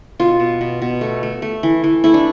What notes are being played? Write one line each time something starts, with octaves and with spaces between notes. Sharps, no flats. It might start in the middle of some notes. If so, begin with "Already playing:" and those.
B2 F4
B2
B2
B2
A3
A3
A3
E3
E3
A3 E4
D4